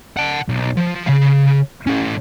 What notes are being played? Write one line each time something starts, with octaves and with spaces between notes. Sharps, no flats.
F#5 A5
B1
F3
C#3 F5
E3 C#4